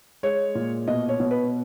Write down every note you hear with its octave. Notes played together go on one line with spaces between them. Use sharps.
G#3 C#5
A#2
B2 D#5
C#5
B2
B4